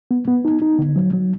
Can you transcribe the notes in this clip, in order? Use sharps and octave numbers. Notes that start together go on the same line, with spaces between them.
B3
B3
D#4
D#4
D3
F#3
F#3